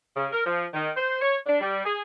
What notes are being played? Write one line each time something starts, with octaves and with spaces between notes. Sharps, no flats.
C#3
A#4
F3
D#3
C5
C#5
D4
G3
G#4